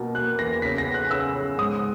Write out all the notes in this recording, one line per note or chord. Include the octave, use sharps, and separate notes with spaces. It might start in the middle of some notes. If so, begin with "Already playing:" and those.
Already playing: B2 A#3
A#3 F#6
E2 A#6
C#3 B6
A#6
B3
F#6
C#3 E6
C#3
G#2 D#6